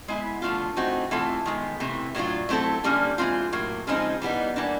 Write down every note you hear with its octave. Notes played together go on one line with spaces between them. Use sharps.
G#3 B3 E4
D3 F3 A3 C4 F4
E3 A3 C4 D#4 F#4
E3 A3 C4 F4 A4
D#3 G#3 B3
C3 E3 A3
A2 F#3 B3 D4 F4
F#3 A3 C4 E4 A4
D3 G3 A#3 C#4
E3 G#3 C4 F4
A2 F#3 A#3
C#3 F3 G#3 C4 D#4
E3 G3 B3 D#4
E3 G3 A#3 D4